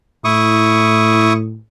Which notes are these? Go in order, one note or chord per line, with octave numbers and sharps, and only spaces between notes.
A2 E4 C#6 D#6